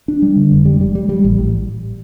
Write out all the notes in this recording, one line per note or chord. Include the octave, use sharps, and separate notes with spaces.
D4
G3
D3
F1
G3
G3
G3
G3
A1
A1